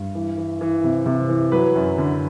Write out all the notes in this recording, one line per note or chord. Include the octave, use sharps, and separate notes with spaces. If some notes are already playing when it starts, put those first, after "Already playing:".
Already playing: G2
E3
E3
E3
C3
C3
E3
F#3 B4
F#2
D3